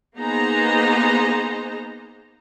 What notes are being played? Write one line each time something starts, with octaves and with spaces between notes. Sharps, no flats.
A#3 B3 D#4 G#4 C5 A#5